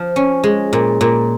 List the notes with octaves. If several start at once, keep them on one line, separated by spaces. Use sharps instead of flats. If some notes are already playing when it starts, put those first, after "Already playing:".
Already playing: F3
C#4
G#3
A#2
A#2